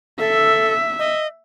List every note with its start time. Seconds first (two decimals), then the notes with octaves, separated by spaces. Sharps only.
0.20 A4 E5
0.99 D#5